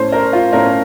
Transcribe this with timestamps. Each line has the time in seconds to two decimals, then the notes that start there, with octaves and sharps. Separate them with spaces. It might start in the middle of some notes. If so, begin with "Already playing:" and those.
Already playing: A2 A3 C#4 C5
0.12 A#4
0.33 F4
0.53 A2 A3 C#4 A#4